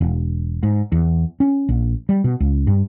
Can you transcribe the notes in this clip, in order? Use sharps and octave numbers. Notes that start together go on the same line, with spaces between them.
E1
G#2
E2
C#4
A#1
G3
B2
C#2
G2